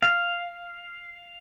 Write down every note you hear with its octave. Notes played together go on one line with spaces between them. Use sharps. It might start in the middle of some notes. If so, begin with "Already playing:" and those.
F5